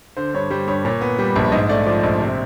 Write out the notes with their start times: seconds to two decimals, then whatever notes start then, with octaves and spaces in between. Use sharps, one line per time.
0.17 D3 C5
0.35 G2 C#5
0.50 G3 C5
0.67 G2 C#5
0.85 A#2 C#5
1.01 B3
1.19 G3
1.36 A#1
1.52 G#2 D#5
1.69 A3 D5
1.86 F3 D5
2.03 A#1 D#5
2.20 C3 C5